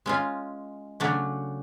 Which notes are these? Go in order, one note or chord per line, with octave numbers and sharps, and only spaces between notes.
G#3 C#4 F4
C#3 F#3 A3 D4